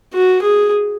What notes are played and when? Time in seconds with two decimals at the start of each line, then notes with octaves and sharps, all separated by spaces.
0.14 F#4
0.42 G#4